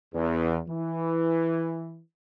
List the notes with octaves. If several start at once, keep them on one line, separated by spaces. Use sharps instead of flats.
E2
E3